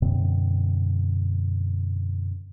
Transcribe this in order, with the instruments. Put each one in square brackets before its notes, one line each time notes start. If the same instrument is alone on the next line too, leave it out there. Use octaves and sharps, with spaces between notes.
[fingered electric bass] F#2 B2 D3 C4